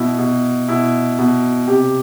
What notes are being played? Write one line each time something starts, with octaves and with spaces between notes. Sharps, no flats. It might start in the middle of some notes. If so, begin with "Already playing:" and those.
Already playing: B2 E4
B2
B2 E4
B2
C3 G4